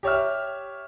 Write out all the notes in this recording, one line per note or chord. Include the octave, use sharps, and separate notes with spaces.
G4 C#5 E5 F6